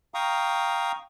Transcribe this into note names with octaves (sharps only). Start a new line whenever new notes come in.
F5 G5 A#5 C#6 D#6